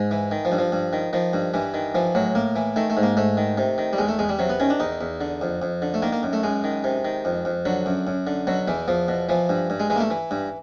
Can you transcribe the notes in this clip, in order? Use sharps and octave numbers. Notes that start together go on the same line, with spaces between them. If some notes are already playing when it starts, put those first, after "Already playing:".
Already playing: G#2
E3
D#3
F3
G2
F3
G2
D#3
D#3 F3
G2
G2 E3
D#3
E3 F3
A2 F#3
A2 A#3
E3
D#3 A3
A3
G#2
A#3
G#2 A3
D#3
C3
D#3
G3
E2 G#3
A3
E2 G#3
G3
C3 F#3
B3
D#3 C#4
D4
E2 D#4
E2
D3
F2
F2
D3
A3
D#3 A#3
A#3
F#2
A3
F#2 G#3
D#3
C3
D#3
F2
F2
D3 F#3
F#2
F#2
D3
B2 F#3
E2 E3
E2 F3
B2
E3 F3
G2
G2
G#3
E3 G#3
A#3
A3
E3
G2